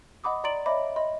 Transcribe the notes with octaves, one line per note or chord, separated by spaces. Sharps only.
D#5 F#5 B5 D6 D#6
D5 A#5 C6 A6 D7 F#7
C#5 D#5 E5 B5 D6
D#5 B5 C6